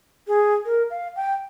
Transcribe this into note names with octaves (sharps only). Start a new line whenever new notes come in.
G#4
A#4
F5
G5